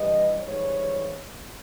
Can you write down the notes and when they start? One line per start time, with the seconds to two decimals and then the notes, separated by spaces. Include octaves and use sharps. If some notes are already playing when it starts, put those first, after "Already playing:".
Already playing: G2 E3 G3 D#5
0.39 G#2 E3 G3 C#5